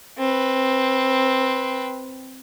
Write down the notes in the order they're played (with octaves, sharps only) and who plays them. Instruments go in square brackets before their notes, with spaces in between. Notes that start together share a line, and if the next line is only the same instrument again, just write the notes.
[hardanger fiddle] C4 B4